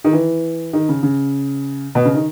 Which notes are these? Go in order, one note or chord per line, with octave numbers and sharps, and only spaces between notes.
D#3
E3
D#3
C#3
C#3
B2
C#3
D#3